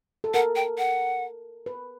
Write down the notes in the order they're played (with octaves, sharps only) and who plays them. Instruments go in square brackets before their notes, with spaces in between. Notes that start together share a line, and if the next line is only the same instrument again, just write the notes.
[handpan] A4
[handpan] A#4 [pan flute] F#5
[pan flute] G5
F#5
[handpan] B4